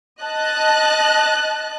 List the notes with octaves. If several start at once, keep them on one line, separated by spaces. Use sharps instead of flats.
D#5 A5 F#6